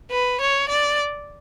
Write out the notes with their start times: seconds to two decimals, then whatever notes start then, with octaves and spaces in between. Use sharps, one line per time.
0.11 B4
0.41 C#5
0.69 D5